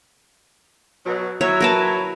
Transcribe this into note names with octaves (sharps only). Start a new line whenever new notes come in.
B2 F#3
F#3 E4 C#5
A#4 B4 A5